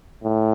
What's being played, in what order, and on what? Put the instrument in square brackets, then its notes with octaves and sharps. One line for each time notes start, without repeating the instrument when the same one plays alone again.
[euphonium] A2